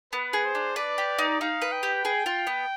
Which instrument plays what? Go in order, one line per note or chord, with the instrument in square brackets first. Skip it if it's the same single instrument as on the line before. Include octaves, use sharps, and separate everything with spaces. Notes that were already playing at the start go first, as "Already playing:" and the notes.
[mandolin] B3 [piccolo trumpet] B4
[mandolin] G#4
[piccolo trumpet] C5
[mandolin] D4
[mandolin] B4 [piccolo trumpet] D5
[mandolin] G4
D#4
[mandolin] D#4 [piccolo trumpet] F5
[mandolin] B4
[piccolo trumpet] G5
[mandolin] G4
G#4
F4
B3